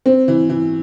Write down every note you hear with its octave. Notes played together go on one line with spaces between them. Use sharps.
C4
E3
E3